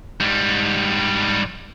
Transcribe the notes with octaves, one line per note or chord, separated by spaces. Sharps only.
G#2 G3